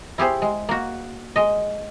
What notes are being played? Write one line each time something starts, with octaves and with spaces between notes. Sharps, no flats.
E4 G4 G#4 C5
G#3
A#3 F#4
G#3 D#5